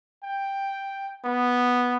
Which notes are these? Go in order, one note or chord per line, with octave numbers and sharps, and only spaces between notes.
G5
B3